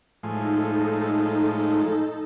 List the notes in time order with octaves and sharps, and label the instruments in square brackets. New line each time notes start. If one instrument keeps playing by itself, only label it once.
[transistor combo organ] A2 F3 G#3 [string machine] D#4 A4